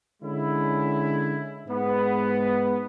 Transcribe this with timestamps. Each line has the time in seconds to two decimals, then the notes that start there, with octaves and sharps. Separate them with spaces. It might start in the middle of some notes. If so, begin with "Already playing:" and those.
0.22 D3 G#3 C#4 E4
1.65 G#2 G#3 B3